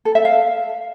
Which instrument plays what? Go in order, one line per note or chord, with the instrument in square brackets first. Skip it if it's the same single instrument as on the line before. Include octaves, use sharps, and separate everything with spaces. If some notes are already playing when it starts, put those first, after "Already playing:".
[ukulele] A4
E5
F5